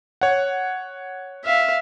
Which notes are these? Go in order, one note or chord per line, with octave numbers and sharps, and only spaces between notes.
C#5 F#5
E5 F5